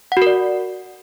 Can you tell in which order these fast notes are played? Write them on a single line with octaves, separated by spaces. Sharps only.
F#5 F#4 A#4 D5